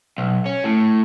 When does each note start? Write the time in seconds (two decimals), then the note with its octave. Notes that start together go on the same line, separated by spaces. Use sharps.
0.18 B1
0.46 C#4
0.64 A2